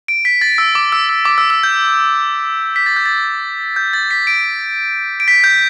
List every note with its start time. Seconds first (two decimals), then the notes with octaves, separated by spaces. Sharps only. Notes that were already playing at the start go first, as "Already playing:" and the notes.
0.08 D7
0.25 B6
0.41 A6
0.58 E6
0.75 D6
0.92 E6
1.09 E6
1.25 D6
1.38 E6
1.50 E6
1.63 G6
2.76 B6
2.86 A6
2.96 G6
3.06 A6
3.76 G6
3.93 A6
4.11 B6
4.27 D7
5.20 D7
5.28 B6
5.44 G6